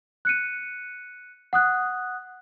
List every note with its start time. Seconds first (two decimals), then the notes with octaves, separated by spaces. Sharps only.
0.25 F#6 C#7 D#7
1.53 F#5 D#6 F#6